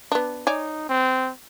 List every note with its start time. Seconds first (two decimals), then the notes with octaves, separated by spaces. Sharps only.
0.12 B3 D4
0.47 D#4 C#5 D5 G#5
0.89 C4